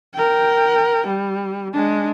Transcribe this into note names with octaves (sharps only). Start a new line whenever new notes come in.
A#4 G5
G3
G#3 D4